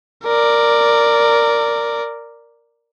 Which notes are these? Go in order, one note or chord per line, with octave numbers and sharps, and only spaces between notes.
A#4 D5